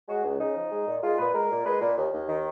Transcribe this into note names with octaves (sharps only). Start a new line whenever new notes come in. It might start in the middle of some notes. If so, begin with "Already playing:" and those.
G#3 F#4
C#2
C#3 D#4
F3
G#3
A#2
G#3 F4
A#2 B4
G#3 A#4
A#2
G#3 B4
A#2
D#2
D#2
D#3